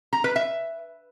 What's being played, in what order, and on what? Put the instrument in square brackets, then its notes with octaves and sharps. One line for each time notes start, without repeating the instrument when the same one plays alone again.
[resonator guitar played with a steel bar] A#5
B4
E5